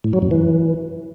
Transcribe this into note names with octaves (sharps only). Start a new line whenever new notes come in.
A2
F#3
F#2
E3